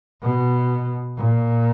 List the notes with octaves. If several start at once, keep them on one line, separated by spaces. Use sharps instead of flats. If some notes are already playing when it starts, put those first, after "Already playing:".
B2
A#2